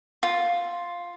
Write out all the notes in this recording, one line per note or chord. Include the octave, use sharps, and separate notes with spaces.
F4